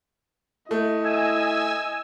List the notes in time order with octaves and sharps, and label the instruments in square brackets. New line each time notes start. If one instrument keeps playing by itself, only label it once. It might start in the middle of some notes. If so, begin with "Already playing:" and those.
[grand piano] A3 [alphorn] E4 [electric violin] D#5
[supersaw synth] G#5 E6